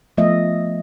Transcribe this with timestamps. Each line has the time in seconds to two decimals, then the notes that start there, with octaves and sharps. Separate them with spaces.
0.18 F3 A3 B3 F4 D#5 E5